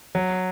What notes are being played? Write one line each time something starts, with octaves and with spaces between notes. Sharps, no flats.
F#3